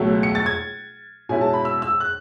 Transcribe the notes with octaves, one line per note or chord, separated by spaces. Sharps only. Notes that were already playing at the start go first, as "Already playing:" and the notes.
Already playing: C#2 B2 F#3 A3
C#7
A6
G#6
B2 G#3 C#4 E4 G#5
A5
B5
E6
E6
F#6